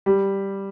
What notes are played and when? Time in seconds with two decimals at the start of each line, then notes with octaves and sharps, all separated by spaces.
0.06 G3